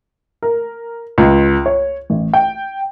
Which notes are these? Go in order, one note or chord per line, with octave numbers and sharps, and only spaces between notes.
A#4
C#2
C#5
A1
G5